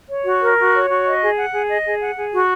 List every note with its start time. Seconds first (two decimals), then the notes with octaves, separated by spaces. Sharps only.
0.10 C#5
0.26 F#4
0.41 A#4
0.58 F#4
0.74 C#5
0.90 F#4
1.06 D#5
1.22 G#4
1.38 F#5
1.54 G#4
1.70 D#5
1.86 G#4
2.01 F#5
2.17 G#4
2.33 F#4